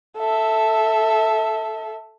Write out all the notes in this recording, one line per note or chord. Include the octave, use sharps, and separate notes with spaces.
A4 E5